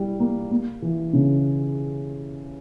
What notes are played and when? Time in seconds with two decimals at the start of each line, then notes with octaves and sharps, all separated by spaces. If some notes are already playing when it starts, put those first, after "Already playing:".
Already playing: G3 E4
0.20 A#3
0.51 A#3
0.82 E3
1.13 C#3